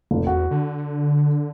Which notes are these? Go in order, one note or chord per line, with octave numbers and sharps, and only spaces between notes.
F1
E2 F#4
D3